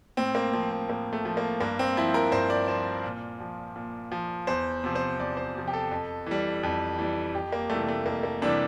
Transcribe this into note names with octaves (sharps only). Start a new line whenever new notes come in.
A2 C4
A#3
F3 C4
C4
A2 A#3
A3
F3
A#3
G2 A#3
C4
F3 E4
A#4
G2 C5
D5
F3 C5
A#2
F3
A#2
F3
E2 C5
C3 F3
C5
E2 D5
C5
C3 F3
G4
A4
F2
E3 G3
F2
E3 G3
F2 G4
A#3
C3 E3 G3 A3
A3
F2 A#3
A#3
C3 E3 G3 D4